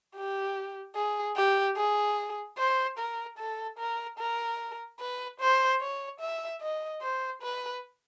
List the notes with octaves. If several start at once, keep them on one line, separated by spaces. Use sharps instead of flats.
G4
G#4
G4
G#4
C5
A#4
A4
A#4
A#4
B4
C5
C#5
E5
D#5
C5
B4